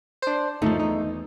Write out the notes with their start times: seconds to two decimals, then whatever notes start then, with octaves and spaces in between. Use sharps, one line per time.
0.22 D4 C5
0.62 G1 D#2 F3 A3 D#4
0.79 E2 D#4